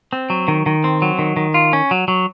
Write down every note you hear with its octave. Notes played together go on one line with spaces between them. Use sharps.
C4
F#3
D#3
D#3
C4
F#3
D#3
D#3
F4
C#4
F#3
F#3